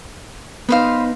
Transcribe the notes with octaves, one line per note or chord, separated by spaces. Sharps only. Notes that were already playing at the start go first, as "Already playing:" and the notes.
B3 D#4 B4 C5 F5